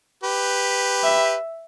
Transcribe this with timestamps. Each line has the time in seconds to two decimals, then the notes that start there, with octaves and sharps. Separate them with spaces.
0.23 G4 B4
1.04 E5